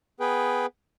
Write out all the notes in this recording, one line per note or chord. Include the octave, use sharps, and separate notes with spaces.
B3 G#4 B4 G5